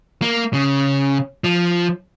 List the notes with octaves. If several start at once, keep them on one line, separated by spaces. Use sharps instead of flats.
A#3
C#3
F3